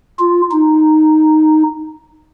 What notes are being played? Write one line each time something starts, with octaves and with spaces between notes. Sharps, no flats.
F4
D#4